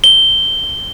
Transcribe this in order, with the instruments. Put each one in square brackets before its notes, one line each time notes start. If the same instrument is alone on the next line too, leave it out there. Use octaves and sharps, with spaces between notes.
[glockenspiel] G7